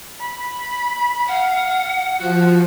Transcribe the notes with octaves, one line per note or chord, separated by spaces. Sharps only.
B5
F5 F#5
F3 F#4